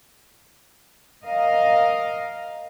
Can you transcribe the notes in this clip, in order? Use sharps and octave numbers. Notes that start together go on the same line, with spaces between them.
A#4 D#5 F5